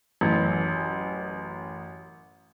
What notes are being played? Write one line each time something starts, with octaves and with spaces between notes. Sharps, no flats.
A1 F#2